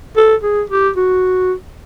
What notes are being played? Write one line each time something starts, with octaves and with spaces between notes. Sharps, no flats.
A4
G#4
G4
F#4